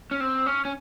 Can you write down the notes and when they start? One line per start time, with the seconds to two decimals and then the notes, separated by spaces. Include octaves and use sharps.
0.11 C#4
0.20 C4
0.46 C#4
0.65 C#4